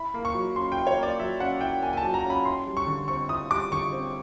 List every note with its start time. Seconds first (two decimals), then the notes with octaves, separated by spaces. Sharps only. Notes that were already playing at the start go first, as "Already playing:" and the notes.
Already playing: E4 B5
0.14 A#3
0.25 C#6
0.35 F#3
0.56 C#4 C6
0.72 E4 G5
0.87 C#5
0.98 A#3 D5
1.19 F#3 E5
1.40 C#4 F#5
1.61 E4 G5
1.82 A#3 G#5
1.93 G#5
1.97 A5
2.03 F#3
2.14 A#5
2.25 C#4
2.30 B5
2.45 E4 C6
2.67 G3
2.77 C#6
2.87 D3
3.08 C4 C#6
3.29 E4 D#6
3.51 G3 D6
3.71 D3 C#6
3.92 C4